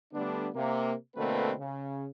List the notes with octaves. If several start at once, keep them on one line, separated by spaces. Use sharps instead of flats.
D3 G3 A3 B3 D4
C3 A#3
B2 D3 A3 A#3 C4 B4
C#3